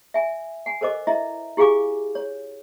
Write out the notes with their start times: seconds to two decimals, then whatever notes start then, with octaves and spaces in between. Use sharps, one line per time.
0.14 E5 G#5
0.66 F#5 G#5
0.81 A4 A#4 C5 D#5 D6
1.07 E4 D#5 E5 A#5
1.57 E4 G4 G#4 F5 G#5 D6
2.15 C#5